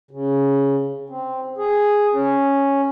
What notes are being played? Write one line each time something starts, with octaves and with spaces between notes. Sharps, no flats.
C#3
C4
G#4
C#4